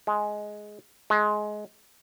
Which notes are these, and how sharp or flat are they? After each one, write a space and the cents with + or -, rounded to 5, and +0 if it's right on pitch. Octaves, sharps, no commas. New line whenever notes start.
G#3 +10
G#3 +20